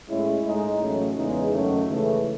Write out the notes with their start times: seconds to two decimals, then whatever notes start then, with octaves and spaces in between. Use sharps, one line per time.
0.08 A2 G#3 C#4 E4
0.44 A2 G#3 D#4
0.80 A1 A2 F#3 A3 C#4
1.16 E2 C#3 E3 G#3 D#4
1.51 F#2 D#3 F#3 A3 C#4
1.87 C#2 C#3 E3 A3